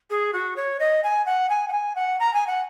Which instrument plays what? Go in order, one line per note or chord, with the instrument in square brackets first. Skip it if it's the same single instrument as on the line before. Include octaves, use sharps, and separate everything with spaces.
[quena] G#4
F#4
C#5
D#5
G#5
F#5
G#5
F#5
G#5
F#5
A#5
G#5
F#5